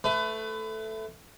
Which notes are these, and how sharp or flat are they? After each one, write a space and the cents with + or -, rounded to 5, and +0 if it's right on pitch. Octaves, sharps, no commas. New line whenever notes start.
A3 +0 B4 +30